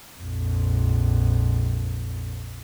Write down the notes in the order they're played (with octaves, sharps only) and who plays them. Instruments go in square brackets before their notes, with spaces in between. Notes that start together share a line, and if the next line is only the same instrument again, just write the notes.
[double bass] A#1 F2